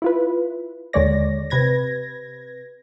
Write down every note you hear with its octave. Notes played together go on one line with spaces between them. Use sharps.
E4 F4 B4
D#2 D3 G#3 C#5 D5 A#6
C3 B4 G#6 A#6